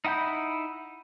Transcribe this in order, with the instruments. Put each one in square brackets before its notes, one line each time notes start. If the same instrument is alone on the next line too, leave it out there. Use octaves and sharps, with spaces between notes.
[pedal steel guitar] D#4 E4 F#5 B5 G6